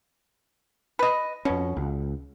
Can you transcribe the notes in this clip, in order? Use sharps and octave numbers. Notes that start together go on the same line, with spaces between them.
B4 D#5
F2 B2 C#4
C#2